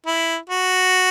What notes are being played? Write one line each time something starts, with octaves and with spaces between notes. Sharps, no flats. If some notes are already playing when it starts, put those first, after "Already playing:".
E4
F#4